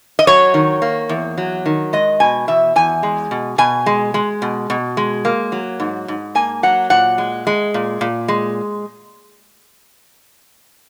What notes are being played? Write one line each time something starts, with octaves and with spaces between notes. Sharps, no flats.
D#5
F#3 C#5
D#3
A#3
E2
F#3
D#3
G#3 D#5
B2 G#5
E2 E5
E2 G#5
G#3
B2
B2 G#5
G#3
G#3
B2
B2
G#3
A#3
F#3
G#2
G#2
A#3 G#5
F#3 F#5
A#2 F#5
G#3
G#3
A#2
A#2
G#3